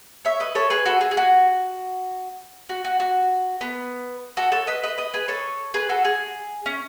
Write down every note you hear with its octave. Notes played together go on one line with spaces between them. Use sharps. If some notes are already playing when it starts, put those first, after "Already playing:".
C#5 E5
B4 D#5
A4 C#5
G#4 B4
F#4 A4
G#4
G#4
F#4
F#4
F#4
F#4
B3
F#4 A4
A4 C#5
B4 D#5
B4 D#5
B4 D#5
G#4 B4
A4 C#5
G#4 B4
F#4 A4
G#4
C#4